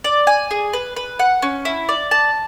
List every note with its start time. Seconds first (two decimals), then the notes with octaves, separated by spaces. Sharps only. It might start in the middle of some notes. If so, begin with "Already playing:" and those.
0.04 D5
0.27 G#5
0.51 G#4
0.73 B4
0.96 B4
1.19 F#5
1.42 C#4
1.65 E4
1.89 D5
2.11 A5